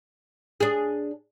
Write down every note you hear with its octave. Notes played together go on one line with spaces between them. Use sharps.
D4 G#4